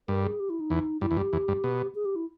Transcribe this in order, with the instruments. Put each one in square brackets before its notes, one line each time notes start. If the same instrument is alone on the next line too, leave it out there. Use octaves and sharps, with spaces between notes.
[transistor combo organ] G2 [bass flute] A#4
[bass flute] G#4
G4
E4
D#4
[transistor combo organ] E2
[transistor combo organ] G2 [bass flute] E4
[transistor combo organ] E2
[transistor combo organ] G2 [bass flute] G4
[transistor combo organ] E2
G2
B2
[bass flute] G#4
G4
E4